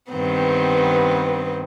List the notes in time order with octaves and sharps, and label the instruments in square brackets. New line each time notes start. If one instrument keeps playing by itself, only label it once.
[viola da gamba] G2 D#3 C4 [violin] B3